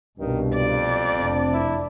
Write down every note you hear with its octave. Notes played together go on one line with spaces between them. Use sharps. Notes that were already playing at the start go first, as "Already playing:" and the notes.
C2 G2 B2 D#3
F2 D5
F1 C4 D4
E4